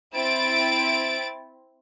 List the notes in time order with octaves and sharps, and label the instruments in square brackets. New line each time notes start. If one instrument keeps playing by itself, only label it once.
[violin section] C4 E4 A6 D7